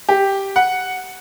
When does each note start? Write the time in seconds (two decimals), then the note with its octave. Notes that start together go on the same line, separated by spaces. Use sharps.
0.09 G4
0.56 F#5